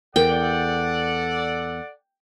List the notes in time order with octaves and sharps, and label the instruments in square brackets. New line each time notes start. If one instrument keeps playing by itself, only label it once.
[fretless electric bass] E2 [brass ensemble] A4 D5 F#5 [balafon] A#4 [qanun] G5